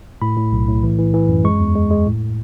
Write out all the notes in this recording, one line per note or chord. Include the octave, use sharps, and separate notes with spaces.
A2 B5
A2
B1
A2
E3
E3
E3
F#2
G#3 C#6
E2
G#3
G#3
A2